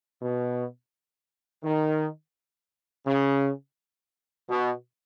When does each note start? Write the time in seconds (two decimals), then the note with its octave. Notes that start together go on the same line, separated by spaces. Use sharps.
0.22 B2
1.65 D#3
3.07 C#3
4.50 B2